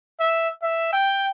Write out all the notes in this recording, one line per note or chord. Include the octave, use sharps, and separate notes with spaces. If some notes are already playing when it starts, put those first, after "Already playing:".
E5
E5
G5